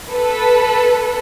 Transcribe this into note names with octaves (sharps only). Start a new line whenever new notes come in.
A4 B4